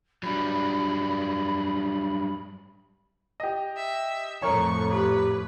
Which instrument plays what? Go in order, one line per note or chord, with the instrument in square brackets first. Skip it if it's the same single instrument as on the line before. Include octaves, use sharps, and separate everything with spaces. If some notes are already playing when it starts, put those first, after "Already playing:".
[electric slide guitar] F#3 G3 D4 [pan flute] B5
[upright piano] G4 D#5
[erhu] E5
[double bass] F2 A2 [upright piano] A#4 C#5 [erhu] C#6
[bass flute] G4 [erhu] B4